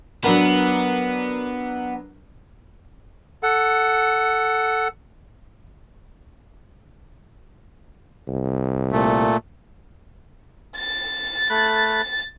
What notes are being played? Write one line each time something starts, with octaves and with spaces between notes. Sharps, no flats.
F#3 B3 D4 A#4
A4 F#5
C2
A#2 A3
A6
A3 B5 F#6